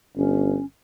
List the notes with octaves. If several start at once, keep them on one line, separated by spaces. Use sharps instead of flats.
G1 C#4